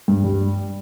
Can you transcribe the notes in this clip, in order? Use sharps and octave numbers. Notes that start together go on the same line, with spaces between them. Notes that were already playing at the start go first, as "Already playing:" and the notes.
G2
G3